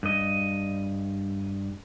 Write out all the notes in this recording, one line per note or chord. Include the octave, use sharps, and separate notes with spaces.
G2 D#5